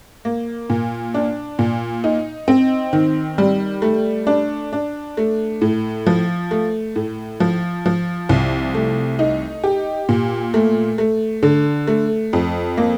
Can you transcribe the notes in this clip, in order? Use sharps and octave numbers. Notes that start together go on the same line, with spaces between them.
A#3
A#2
D4
A#2
D#4
C4
D#3
G3
A3
D4
D4
A3
A2
F3
A3
A2
F3
F3
C2
A3
D#4
G4
A#2
A3
A3
D3
A3
F2
A#3